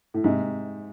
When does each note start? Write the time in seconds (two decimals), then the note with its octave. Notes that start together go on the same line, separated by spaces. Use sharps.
0.14 A2
0.24 G#2 C3